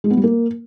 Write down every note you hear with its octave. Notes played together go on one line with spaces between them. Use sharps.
G#3
B3
G3
A#3